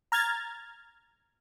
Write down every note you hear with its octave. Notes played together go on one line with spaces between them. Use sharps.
A#5 F6 G#6 A6